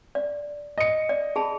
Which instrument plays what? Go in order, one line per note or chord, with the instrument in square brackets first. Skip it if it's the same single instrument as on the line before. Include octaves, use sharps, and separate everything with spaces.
[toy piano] D5
[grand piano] D#5 C#7
[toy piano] D5
G#4 A5 B5